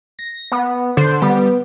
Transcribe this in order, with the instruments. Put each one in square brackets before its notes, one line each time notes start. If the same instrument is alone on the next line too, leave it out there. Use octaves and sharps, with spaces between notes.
[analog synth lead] A#6
B3
[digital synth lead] D3 [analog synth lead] C5
[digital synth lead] G3 [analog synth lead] B3